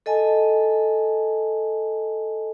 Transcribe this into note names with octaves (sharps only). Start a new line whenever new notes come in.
A4 D#5 G#5 A5